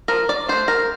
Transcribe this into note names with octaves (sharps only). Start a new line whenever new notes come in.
F3 A#4
D5
A3 D4 C5
A#4